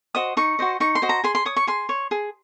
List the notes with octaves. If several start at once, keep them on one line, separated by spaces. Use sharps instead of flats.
F#4 C5 D#5 D#6
D#4 C#6
F#4 C5 D#5
D#4 C#6
C6
F#4 C5 D#5
A#5
G#4 C6
C6
C#5 D#6
C#6
G#4 C6
C#5
G#4